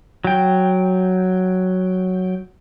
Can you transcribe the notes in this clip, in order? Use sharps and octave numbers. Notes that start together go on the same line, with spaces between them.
F#3 G5